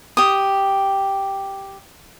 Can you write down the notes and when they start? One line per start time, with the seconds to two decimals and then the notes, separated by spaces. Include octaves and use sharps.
0.17 G4 D#6